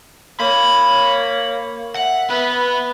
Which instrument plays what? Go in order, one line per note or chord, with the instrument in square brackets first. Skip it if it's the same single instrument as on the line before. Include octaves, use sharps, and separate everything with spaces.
[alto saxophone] A#3 [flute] C#5 [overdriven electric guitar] B5
[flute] E5 [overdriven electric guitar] F#5
[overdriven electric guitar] B3 [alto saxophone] B4